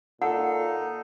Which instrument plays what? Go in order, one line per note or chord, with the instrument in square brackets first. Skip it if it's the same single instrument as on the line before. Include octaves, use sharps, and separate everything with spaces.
[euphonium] A#2 [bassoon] D#4 [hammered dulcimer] A4 [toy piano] F#5